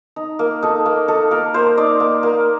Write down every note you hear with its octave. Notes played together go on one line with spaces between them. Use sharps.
D#4
A#3
D#4 A4
A#3
D#4 A4
A#3 A#4
A#3 C5
D#4 D5
A#3
A#3